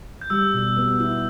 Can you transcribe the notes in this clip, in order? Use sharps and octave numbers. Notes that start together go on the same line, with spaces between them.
G6
G3 E6
B2
B3
E4